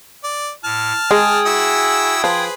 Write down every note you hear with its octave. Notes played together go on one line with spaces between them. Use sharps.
D5
A2 A5 F6
G#3 G#4 G5 D#6 G#6
E4 F#4 E6
F3 G#4 B4 C5